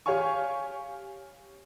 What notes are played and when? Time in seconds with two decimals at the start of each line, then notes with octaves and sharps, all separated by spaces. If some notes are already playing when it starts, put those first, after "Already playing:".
0.06 G4 C#5 F5 G#5 C#6